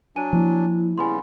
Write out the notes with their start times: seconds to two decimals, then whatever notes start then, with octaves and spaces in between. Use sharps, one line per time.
0.16 F#3 D4 G#5 D#7
0.33 F3 A#3 E4
0.98 C#3 G3 B3 G#5 B5 C6